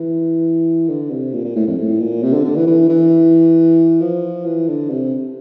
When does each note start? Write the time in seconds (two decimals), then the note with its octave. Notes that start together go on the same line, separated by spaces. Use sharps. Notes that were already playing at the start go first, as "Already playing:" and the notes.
Already playing: E3
0.88 D3
1.11 C3
1.34 A#2
1.45 A#2
1.56 A2
1.67 F2
1.78 A2
2.00 A#2
2.23 C3
2.33 D3
2.45 D3
2.56 E3
2.67 E3
2.89 E3
4.01 F3
4.46 E3
4.68 D3
4.90 C3